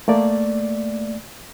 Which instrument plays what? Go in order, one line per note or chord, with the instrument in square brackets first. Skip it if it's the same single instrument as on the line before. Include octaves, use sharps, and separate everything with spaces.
[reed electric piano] A3 A#3 D5